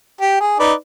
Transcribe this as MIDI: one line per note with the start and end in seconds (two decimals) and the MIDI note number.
0.21 0.37 67
0.40 0.57 68
0.59 0.73 63
0.59 0.73 71
0.59 0.73 74